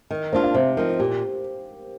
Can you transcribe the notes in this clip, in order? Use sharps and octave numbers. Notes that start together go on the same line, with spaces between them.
D#3
A#3 D4 F4 C5
F5
C3 C5
F3 C4 D#4 A#4
A#2 G4